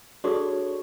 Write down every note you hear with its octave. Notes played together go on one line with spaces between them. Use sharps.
D4 F#4 G#4 A4 C#5